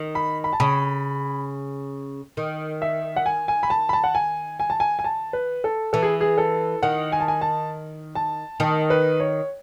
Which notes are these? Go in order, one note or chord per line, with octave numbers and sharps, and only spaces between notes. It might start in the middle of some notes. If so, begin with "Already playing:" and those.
Already playing: D#3
B5
B5
A5
C#3 B5
D#3
E5
F#5
G#5
G#5
B5
A5
B5
A5
F#5
G#5
G#5
A5
G#5
G#5
A5
B4
A4
E3 A4
G#4
G#4
A4
D#3 F#5
G#5
A5
G#5
A5
A5
D#3 A5
B4
C#5